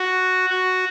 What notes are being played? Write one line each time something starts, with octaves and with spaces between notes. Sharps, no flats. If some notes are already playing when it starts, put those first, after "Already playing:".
Already playing: F#4
F#4